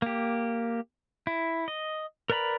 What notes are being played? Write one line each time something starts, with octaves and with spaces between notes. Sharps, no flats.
A#3 G4
E4
D#5
A#4 B4 D5 A#5 B5